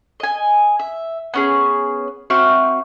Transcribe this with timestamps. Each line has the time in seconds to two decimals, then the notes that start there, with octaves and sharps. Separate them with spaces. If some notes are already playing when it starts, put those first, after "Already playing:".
0.20 D#5 G#5
0.79 E5
1.34 B3 C#4 G#4
2.30 C4 F#4 E5 F6